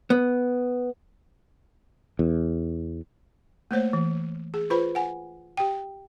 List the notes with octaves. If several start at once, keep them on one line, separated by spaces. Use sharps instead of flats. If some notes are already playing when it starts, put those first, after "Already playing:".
B3
E2
A3 A#3 C5 C#5
E3
G#4
F4 B4 C5 B5
F#5 G#5
G4 G5